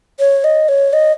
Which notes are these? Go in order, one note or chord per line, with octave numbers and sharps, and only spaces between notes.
C#5
D#5
C#5
D#5